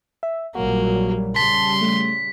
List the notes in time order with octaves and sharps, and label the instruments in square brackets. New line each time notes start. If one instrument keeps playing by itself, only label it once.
[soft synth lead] E5
[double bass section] A#1 F#3 G3 [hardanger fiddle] A#3 [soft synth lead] F#4
[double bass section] C#3 G3 [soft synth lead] A5 [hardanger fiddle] C6 [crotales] B6
[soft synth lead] A3